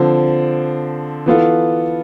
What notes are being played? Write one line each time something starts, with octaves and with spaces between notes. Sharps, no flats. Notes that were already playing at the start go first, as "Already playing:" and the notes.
Already playing: D3 F3 C4
E3 B3 F4 A4